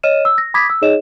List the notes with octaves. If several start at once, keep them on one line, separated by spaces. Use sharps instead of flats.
C#5 D#5 F6 D#7 E7
E6
A#6
B5 D6 D#6 G#6 A#6 B6
E6
D#4 G#4 C#5 D#5 E7